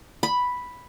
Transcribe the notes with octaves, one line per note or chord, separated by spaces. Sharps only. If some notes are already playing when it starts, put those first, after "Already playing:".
B5